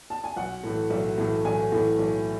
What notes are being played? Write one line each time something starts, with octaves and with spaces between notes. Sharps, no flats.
A5
G#5
B1 F#5
A2 E3 A3
B1
A2 E3 A3
B1 G#5
A2 E3 A3
B1